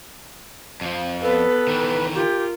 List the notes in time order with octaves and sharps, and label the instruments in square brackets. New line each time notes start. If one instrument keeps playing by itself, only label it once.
[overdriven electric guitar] F2 F3
[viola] B3 A4 [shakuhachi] B4
[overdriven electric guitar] D#3 E3
[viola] F4 A#4 [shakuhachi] G4